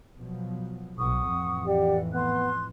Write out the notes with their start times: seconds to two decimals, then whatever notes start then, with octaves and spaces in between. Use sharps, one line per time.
0.17 B2 F3 F#3
0.98 B1 F#5 C#6 D#6
1.32 F2 A2 E3
1.66 G4 D5 F#5
2.14 B3 C6 F#6